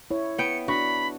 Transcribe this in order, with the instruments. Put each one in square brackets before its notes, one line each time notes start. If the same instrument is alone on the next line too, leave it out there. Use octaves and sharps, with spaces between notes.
[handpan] E4 C#5
[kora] B3 G5 [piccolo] C#7
[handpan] D4 [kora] F#4 [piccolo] B5